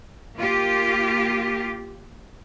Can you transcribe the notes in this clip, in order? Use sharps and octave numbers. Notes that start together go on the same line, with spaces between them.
A#3 F4 G4